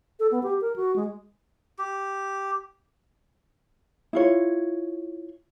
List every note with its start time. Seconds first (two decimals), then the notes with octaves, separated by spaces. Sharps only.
0.20 A4
0.31 B3
0.43 G4
0.61 A#4
0.76 F#4
0.96 G#3
1.79 G4
4.13 E4 F4 C#5